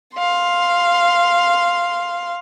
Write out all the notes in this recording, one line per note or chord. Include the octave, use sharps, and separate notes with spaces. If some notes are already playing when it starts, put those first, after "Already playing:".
F5 C6